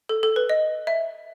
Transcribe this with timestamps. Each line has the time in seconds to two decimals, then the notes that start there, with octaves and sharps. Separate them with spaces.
0.09 A4
0.23 A4
0.36 B4
0.49 D#5
0.87 E5